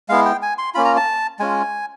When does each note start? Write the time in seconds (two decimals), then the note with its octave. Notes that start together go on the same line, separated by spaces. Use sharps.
0.09 G#3 B3 E4 F5
0.25 G5
0.42 G#5
0.58 C6
0.74 A#3 C#4 F4 B5
0.85 A#5
0.97 A5
1.39 G#3 C#4 F4 G#5